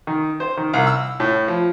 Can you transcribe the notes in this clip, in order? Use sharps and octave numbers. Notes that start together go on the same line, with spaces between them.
D#3
C5
D#3
C2
E6
A2
F3